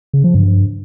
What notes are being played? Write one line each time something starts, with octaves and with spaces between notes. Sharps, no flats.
C#3
F3
G2